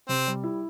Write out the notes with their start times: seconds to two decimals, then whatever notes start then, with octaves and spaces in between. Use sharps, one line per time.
0.09 C3 C4
0.27 G3
0.44 E4